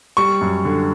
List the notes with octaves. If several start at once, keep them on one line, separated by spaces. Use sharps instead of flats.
G3 C#6
F#2
D3